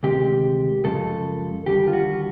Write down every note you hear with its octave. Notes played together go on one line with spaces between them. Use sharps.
D2 C3 D#3 G#3 G4
F#2 C#3 F3 G#3 A4
D#2 D3 G3 G4
F4
F#4